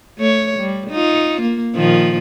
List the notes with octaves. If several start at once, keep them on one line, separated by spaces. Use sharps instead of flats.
A3 C#5
G3
D#4 F4
A#3
A#2 D#3 F3